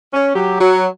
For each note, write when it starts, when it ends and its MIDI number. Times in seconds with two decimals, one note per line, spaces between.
0.13 0.31 61
0.34 0.56 54
0.34 0.56 67
0.60 0.86 54